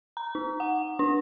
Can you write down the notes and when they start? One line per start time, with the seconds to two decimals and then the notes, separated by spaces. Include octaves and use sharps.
0.17 A#5
0.35 D#4
0.60 F#5
0.99 D4